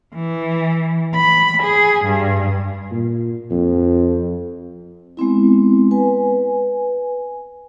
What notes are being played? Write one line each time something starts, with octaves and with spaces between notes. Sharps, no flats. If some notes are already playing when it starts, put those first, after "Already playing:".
E3
B5
G#4
G2
A#2
F2
G#3 B3 C4 E4
B4 G#5